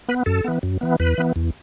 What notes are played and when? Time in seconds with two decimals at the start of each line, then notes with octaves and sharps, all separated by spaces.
0.09 B3 B4
0.26 F#2 A4
0.44 E3 B3
0.63 F#2
0.81 E3 B3
1.00 E2 B4
1.18 E3 B3
1.36 E2